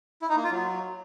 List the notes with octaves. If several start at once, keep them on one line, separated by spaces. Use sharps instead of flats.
E4
D#4
A#3
F4
F#3